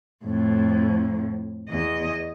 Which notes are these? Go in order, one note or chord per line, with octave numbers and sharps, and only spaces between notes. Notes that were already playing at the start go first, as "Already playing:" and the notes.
F2 A2
E2 D#5